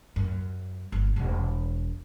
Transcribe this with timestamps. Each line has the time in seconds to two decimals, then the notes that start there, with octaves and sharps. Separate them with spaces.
0.16 F#2
0.92 G1
1.16 E1